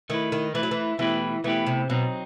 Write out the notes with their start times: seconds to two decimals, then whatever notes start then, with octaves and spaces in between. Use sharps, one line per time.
0.10 D#3 A3 E4 B4
0.32 D#3
0.54 E3 A3 E4 B4
0.63 F#3
0.71 E3
0.99 B2 E3 A3 E4 G4 B4
1.44 B2 E3 A3 E4 G4 B4
1.67 C3
1.90 B2 F#3 C4 D#4